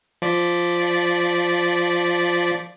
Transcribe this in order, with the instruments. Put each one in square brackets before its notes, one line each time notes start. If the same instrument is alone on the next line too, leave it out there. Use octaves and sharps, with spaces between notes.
[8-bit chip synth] F3 D5 B6